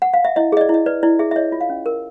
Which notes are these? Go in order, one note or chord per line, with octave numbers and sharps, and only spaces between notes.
F#5
F5
E5
E4 D#5
G#4 D#5
D5
E4 D#5
B4 D5
E4 D5
G#4 E5
E5
C#5 D#5
F4
F5
C#4
A#4